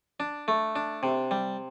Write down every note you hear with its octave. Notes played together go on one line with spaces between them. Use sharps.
D4
A3
D4
C3
G3